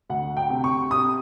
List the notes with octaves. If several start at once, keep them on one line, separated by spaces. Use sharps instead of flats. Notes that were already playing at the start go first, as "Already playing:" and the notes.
D2 F#5
G5
C3
C#6
C3 D#6